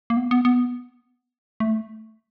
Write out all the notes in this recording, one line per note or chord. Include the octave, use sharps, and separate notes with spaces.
A#3
B3
B3
B3
A3